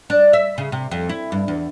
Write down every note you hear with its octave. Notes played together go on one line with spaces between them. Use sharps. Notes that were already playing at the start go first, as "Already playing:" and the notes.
D4
E5
C#3
C3
F2
E4
G2
E2